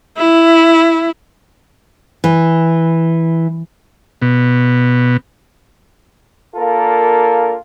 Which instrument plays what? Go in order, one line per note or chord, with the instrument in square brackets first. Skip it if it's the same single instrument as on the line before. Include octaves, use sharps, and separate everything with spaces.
[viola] E4
[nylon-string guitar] E3
[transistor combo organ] B2
[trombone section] A#3 D4 F4 A4 A#4